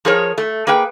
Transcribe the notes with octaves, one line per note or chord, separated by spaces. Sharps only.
F3 G#4 A#4 C#5
A3
A#3 G#4 B4 G5